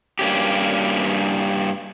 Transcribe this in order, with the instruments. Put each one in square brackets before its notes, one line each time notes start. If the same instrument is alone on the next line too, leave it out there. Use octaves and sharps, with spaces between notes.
[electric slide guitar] G2 A#3 C#4 G4